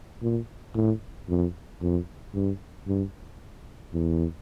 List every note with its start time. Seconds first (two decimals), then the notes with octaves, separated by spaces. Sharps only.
0.22 A#2
0.75 A2
1.29 F2
1.81 F2
2.34 G2
2.87 G2
3.93 E2